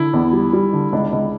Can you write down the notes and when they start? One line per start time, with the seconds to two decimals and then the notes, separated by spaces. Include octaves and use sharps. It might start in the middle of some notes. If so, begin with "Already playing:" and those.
Already playing: D3 E4
0.13 E2
0.33 G3
0.53 G3
0.73 D3
0.93 C#2 D4
1.12 C#2